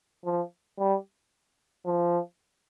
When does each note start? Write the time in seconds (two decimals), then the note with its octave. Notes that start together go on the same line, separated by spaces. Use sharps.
0.24 F3
0.79 G3
1.86 F3